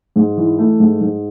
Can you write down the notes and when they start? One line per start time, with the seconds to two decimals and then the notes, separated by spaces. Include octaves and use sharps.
0.16 G#2
0.37 E3
0.58 A3
0.80 G#2
1.01 G#2